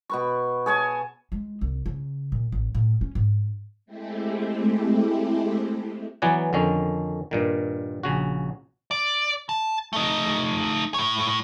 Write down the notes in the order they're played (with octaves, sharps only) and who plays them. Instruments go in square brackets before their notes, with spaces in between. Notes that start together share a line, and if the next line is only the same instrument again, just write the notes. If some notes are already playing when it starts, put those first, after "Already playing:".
[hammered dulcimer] B2 B4 C#6
G#4 C#5 G#5 A5
[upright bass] G#3
C2
C#3
A#2
A1
A2
C#4
G#2
[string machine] G#3 A3 C4 E4 G4
[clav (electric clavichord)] E3 F#3 B3 D5 F#5 G#5
F2 D3 D#3 C#4
G2 A#2 D#3
A#1 C#3 F#4
[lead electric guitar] D5
A5
A3 D#4
A2 C#5